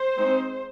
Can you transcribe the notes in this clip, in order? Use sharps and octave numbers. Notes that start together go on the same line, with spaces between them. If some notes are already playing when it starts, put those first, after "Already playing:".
Already playing: C5
G#3 C4 D#4